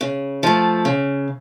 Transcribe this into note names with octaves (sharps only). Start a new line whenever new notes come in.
C#3
F3 A3
C#3